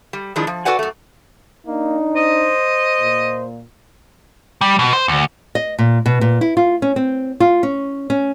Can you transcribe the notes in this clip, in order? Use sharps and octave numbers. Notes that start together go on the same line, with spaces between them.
G3
D#3 F3 G#3 D4 E4
F3
F#4 A4 B4 D5 F#5 G#5
F#2 A3
A#3 D4 D#4
C5 D#5
A#2
G3
B2
C5
D2
D#5
A#2
B2
A#2
E4
F4
C#4
C4
F4
C#4
C#4